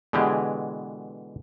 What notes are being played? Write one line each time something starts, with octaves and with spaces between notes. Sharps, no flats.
B2 D3 E3 G#3 G4 G#4